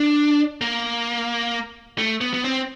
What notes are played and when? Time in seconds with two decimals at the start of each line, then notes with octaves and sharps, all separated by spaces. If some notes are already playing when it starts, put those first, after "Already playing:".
Already playing: D4
0.61 A#3
1.98 A3
2.21 B3
2.34 B3
2.44 C4